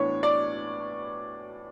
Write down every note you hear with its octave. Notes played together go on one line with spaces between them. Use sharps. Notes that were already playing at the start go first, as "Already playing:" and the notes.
Already playing: A2 E3 B3 D4 C#5
D5